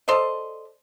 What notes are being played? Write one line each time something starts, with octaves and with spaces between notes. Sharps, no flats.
A4 C5 D5 D#5